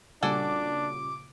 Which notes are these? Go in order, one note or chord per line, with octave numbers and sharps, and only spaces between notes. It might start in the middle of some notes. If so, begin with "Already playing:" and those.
A#2 C#3 G3 D4 F#4 A4 G#5 D6